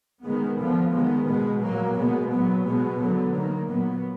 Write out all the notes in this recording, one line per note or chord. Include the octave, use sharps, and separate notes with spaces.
D#3 G#3 B3
D3 F3 B3
D#3 G#3 B3
B2 G#3 B3
A#2 F#3 A#3
B2 G#3 B3
A#2 F#3 B3
B2 G#3 B3
D3 F#3 B3
D#3 A#3
A#2 F#3 B3